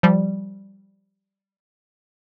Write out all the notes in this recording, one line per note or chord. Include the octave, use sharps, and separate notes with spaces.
F3 G3